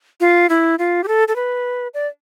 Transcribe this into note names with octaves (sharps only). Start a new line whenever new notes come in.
F4
E4
F4
G4
A4
A4
B4
D5